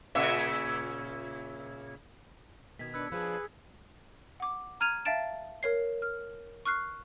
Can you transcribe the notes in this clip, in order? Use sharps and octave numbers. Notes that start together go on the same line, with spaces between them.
A#2 C#3 E5
B2 D#3 G#6 B6
D4 B4 E6 G#6 C#7
F3 D4 G#4 B4 E6
F#5 D6
A#5 F6 G#6 D#7 F7
E5 F5 A5 A6 D7 E7
A#4 C#5 C7
F6
C#6 F6 F#6 C7